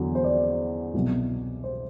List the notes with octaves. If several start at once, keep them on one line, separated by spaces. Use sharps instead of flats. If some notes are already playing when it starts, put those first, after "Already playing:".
Already playing: E2 D3 F#3
C5
D5
C2 B2 F#3
C5